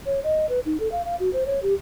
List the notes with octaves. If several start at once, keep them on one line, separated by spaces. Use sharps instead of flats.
C#5
D#5
B4
D#4
A4
F5
F5
F#4
C5
C#5
G4